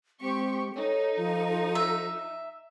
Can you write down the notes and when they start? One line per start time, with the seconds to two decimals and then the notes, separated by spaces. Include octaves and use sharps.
0.21 G#3 C4 G4 C#6
0.75 D#4 A4 C#5
1.17 F3
1.75 E5